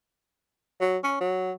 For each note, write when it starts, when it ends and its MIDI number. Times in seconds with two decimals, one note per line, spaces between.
0.81 0.97 54
1.04 1.20 61
1.21 1.52 54